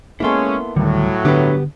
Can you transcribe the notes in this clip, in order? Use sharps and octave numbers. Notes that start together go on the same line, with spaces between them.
G#3 A#3 B3 C#4 E4 A4 C6
D2 A2 D3 D#3 F#3 G3
G2 D3 B3 D4 G4 B4